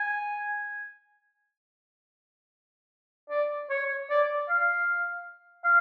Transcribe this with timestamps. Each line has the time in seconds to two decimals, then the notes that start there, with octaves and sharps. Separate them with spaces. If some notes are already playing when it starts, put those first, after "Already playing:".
Already playing: G#5
3.30 D5
3.70 C#5
4.10 D5
4.50 F5
5.65 F5